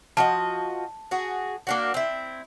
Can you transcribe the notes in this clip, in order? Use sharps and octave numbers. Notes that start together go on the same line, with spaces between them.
F3 F#4 D#5 A5
F#4 G#4
A#3 D4 F#4
C4 E4